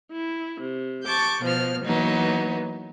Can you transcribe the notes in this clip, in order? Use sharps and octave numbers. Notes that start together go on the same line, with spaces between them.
E4
C3
A5 C#6 D6 G6
B2 F3 C5 F6
E3 F#3 A#3 B3 D#4